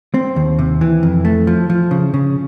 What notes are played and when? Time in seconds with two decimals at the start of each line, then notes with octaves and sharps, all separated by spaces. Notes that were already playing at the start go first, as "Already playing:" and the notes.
0.14 C4
0.36 D#2
0.59 C3
0.81 E3
1.03 F2
1.25 A3
1.47 F3
1.70 F3
1.91 C#3
2.14 C#3